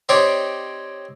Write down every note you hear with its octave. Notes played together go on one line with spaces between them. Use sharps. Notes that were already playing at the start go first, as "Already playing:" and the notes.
C4 D#4 G4 C#5 D5